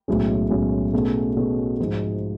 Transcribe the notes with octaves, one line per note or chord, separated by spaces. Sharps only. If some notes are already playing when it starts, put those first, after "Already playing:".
B1 A2 G#3 C#4
B1 A2 G#3 C#4
B2 A3 C#4 G#4
B2 A3 C#4 G#4
G#2 F3 G#3